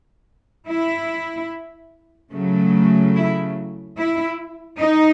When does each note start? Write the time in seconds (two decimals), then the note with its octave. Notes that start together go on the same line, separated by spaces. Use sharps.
0.68 E4
2.33 C#3 F#3 A3
3.16 E4
3.98 E4
4.80 D#4